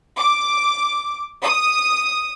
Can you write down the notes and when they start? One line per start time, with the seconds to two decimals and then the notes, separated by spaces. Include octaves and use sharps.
0.17 D6
1.42 D#6